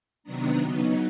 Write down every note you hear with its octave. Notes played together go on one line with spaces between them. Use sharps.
C3 D#3 F#3 B3 D4 A#5
C#3 F#3 B3 D#4